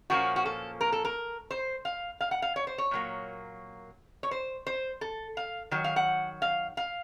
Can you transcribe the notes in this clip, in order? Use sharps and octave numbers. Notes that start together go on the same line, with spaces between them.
A#2 F3 A#3 C#4 F#4
F#4
A4
A#4
A4
A#4
C5
F5
F5
F#5
F5
C#5
C5
C#5
A#2 F#3 A#3
C#5
C5
C5
A4
F5
D#3 F#3
F5
F#5
F5
F5